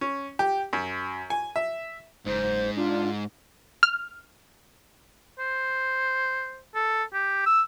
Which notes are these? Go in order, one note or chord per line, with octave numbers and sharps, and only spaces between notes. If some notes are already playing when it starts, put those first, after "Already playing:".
C#4
G4
F#2
G#5
E5
F#1 G#2 C5
D4 F4
F6
C5
A4
G4
E6